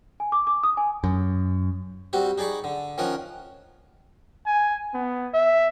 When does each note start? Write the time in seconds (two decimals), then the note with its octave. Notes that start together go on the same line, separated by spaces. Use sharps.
0.20 G#5
0.32 D6
0.47 D6
0.64 D#6
0.77 G#5
1.04 F#2
2.13 G3 C4 F#4 G4
2.38 D#4 G#4 D5 B5 C#6
2.64 D3
2.98 D#3 F3 C#4 A#4 F#5
4.47 G#5
4.94 B3
5.34 E5